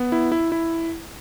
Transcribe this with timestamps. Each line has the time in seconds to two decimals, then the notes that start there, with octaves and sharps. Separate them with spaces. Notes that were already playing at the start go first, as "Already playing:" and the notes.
Already playing: B3
0.12 E4
0.32 E4
0.52 E4